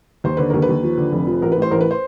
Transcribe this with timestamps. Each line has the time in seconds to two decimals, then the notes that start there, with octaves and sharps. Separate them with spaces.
0.24 D#2 C5
0.37 D3 B4
0.50 D#2 A#4
0.62 B4
0.69 D#2
0.83 F3
0.97 D3
1.12 F1
1.27 F3
1.42 A1 A#4
1.52 A2 B4
1.62 C5
1.71 A1 A#4
1.81 B4
1.91 C5